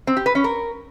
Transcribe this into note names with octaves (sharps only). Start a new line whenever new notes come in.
C4
G4
B4
C#4
A#4